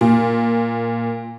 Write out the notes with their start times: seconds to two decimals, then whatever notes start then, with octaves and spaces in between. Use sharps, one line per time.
0.01 A#2